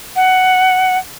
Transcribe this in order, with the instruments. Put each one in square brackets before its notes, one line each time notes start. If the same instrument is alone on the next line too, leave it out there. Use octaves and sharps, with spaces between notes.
[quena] F#5